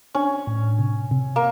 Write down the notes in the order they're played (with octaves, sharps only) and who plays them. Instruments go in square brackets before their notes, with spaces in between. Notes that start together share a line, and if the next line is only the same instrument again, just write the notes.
[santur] C#4 [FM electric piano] D4
[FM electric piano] A2
C3
C3
[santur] A#3